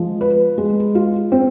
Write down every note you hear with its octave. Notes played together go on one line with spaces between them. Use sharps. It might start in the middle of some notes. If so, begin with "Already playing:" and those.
Already playing: F3 G#3
B4
G#3
F4
C4